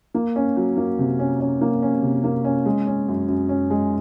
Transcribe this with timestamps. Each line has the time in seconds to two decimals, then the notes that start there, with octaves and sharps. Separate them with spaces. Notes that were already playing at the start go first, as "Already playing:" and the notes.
0.14 A#3
0.36 C#4
0.57 F#3
0.77 A#3
0.99 C3
1.19 C#4
1.40 C#4
1.61 A#3
1.82 C#4
2.02 C3
2.24 A#3
2.44 C#4
2.65 G#3
2.87 C#4
3.08 F#2
3.28 F#2
3.49 C#4
3.70 G#3